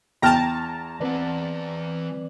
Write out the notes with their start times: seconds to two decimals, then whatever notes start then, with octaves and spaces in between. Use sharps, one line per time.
0.22 E2 G5 A5 A#5 F6
1.00 E3 C4 B4 D5 F#5